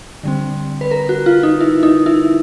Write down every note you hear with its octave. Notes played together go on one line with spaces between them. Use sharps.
D3 G3 C4
B4
A#4
F#4
F4
D#4
E4
D#4
E4